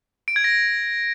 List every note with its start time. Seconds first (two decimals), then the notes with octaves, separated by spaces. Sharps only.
0.28 D7
0.36 G#6
0.44 A#6